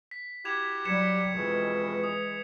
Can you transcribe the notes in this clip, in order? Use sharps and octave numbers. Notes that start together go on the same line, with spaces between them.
B6
E4 F#4 G4 G#6 E7 F7
F#3 G3 G#6 C#7 E7
F2 B2 E3 G#3
D#6